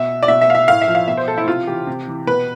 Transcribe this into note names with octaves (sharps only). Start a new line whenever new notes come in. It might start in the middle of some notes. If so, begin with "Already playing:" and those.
Already playing: B2 E5
D5
B2 E5
E5
F5
E5
A2 F5
E5
F3
F5
B2 E5
C5
A4
E4
C3 F4
E3 G4
C3
E3
B2 B4